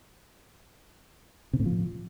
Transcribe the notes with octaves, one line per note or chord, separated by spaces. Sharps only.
C3
A2
F3